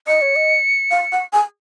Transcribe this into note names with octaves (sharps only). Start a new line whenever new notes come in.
D#5 C#7
C#5
D#5
F5
F#5
G#5